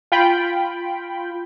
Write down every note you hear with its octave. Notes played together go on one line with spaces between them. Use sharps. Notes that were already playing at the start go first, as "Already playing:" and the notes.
F4 G5 B5